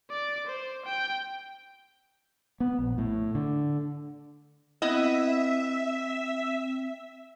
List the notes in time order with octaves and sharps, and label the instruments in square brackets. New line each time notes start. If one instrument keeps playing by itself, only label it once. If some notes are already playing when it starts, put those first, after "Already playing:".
[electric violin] D5 D6
C5
G5
[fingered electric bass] B3
A#1
A2
D3
[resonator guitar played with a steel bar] B3 E4 D#5 [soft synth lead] C4 [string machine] E5